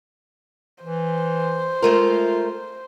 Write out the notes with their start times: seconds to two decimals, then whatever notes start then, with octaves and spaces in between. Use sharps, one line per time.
0.84 E3 C5
1.82 G#3 A3 F4 A#4